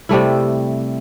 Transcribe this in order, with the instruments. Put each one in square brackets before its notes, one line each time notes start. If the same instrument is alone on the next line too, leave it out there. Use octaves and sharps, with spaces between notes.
[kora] C3 G3 A3 E4